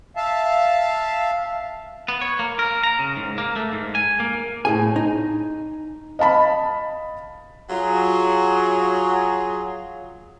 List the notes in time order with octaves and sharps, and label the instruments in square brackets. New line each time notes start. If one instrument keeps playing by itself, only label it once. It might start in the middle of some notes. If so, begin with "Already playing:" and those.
[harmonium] E5 F5 A5
[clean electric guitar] B3
C#5
A#3
A#4
A#5
C#3
G#2
A#3
A3
G#2
G#5
A#3
[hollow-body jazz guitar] A2 G#4 G#5
D#4
[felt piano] D#5 F5 A5 B5
[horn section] F#3 F4 G#4